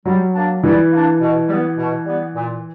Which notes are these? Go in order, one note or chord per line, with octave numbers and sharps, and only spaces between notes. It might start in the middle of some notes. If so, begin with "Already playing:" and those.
F#3 G3
A#3 D4
E3 G3
A#3 D4
B2
G3
B3
B2
G3 B3
A#2